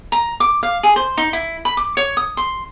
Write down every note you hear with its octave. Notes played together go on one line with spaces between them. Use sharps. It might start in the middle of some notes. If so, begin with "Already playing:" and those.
A#5
D6
F5
G#4
C5
D#4
E4
B5
D6
C#5
D#6
C6